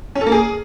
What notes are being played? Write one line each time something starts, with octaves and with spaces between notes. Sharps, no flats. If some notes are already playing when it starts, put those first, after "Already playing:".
C#4
A4
A#3
G#4